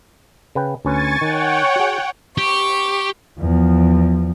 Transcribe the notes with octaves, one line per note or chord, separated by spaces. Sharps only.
C#3 B4 G5
D2 C#4 B4 G#5 C#6 A6
D#3 C#5 F#5 G5
F#4 G#4
G4 C#6
E2 F3